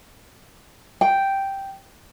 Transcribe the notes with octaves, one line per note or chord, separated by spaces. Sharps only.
G5